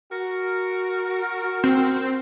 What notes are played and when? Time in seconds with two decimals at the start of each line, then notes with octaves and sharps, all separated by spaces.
0.12 F#4 A#4
1.64 C4